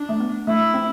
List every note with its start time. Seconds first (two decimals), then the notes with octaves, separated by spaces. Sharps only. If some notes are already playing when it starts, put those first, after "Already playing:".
Already playing: D4
0.09 A3
0.20 B3
0.47 A3 E4
0.74 C4